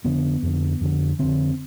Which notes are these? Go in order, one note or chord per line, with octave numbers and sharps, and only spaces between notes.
F2 D3 B3
F2 D3
F2 D3
F2 D3 C4